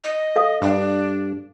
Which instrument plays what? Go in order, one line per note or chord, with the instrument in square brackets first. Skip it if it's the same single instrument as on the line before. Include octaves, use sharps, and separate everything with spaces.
[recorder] D#5
[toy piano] A4 F5 D#6
[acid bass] G2 [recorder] D4